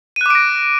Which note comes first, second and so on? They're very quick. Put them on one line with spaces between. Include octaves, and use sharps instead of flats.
D#7 F#6 D6 D7 A#6